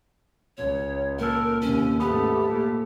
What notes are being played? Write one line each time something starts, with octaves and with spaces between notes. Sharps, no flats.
C#2 C#5
A#2 A4 A#4
D#2 C3 C#4
G#2 A3 B3 G4
A#2